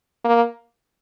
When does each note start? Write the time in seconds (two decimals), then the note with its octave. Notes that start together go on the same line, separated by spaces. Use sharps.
0.24 A#3